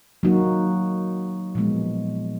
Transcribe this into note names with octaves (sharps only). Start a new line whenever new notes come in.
F#3 A#3 D#4 F#4
A#2 F3 G#3 B3